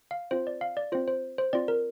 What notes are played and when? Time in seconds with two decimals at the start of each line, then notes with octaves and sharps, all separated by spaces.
0.11 F5
0.31 C4 F4 C5
0.47 D5
0.61 F5
0.77 D5
0.92 C4 F4 C5
1.08 C5
1.38 C5
1.53 C4 F4 D5
1.68 A#4